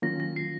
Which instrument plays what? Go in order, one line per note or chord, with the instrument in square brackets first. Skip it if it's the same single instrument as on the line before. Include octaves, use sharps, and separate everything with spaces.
[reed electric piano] D#3 F#3 A#3 C#4 F4 [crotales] A#6
[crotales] A#6
C7